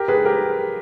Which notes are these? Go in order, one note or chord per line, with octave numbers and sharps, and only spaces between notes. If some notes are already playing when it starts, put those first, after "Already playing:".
Already playing: G4 A#4
G#4 B4
G4 A#4